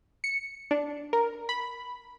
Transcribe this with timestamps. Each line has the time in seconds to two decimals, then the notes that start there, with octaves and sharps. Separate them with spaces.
0.24 C#7
0.71 D4
1.13 A#4
1.49 B5